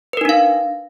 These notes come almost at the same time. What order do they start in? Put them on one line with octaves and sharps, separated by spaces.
B4 A#4 D#4 D4 F5